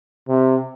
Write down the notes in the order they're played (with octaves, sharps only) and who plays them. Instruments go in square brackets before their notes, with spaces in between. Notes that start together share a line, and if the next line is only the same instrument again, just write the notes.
[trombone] C3